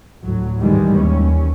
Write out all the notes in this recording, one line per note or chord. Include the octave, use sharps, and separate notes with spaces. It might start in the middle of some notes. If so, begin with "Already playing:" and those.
D2 A2 F#3
G2 D#3 E3 G3 G#3
D#2 C#4